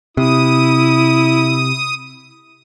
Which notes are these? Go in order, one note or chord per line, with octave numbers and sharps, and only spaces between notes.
C3 E4 D#6